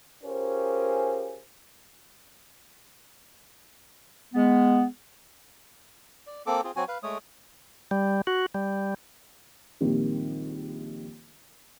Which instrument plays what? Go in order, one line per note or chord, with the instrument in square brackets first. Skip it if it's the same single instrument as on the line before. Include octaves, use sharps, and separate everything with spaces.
[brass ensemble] C#4 F4 G4 G#4 A#4 C5
[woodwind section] G#3 B3
[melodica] D5
A#3 C4 A4 D6
C4 F4 G#4
F#3 C4 F#4 G#5
B4 F5
G#3 A3 C#5 D#6
[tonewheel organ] G3
F#4
G3
[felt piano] A#1 D#3 G3 C4 G4